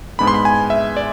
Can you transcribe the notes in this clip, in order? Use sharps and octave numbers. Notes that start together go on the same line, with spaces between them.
G#2 G#3 B3 D4 B5
C6
B5
G#5
E5
D5